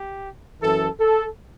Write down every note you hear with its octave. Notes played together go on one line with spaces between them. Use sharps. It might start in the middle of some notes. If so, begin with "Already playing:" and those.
Already playing: G4
F#2 E3 A4
A4